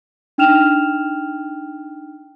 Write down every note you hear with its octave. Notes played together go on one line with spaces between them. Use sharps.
D4 D#4 G5 F6 E7 F7